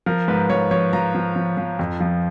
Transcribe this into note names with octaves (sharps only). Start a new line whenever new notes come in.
F3 A#4
G#2 B4
F3 C#5
F3 C#5
F3 A#5
F3
F3
F3
F2
F3